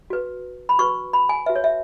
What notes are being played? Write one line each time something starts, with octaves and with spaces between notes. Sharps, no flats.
F#4 B4
B5
F#4 B4 C#6
B5
G#5
F#4 B4 E5
C#5
E5